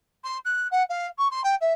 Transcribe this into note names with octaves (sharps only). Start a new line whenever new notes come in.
C6
F#6
F#5
F5
C#6
C6
G5
E5